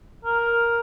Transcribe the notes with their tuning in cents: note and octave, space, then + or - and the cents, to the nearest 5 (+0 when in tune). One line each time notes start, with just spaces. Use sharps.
A#4 +5